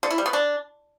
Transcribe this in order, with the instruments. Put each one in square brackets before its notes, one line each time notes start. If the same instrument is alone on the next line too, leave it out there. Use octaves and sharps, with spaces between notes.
[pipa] D3
E4
G3
B3
D4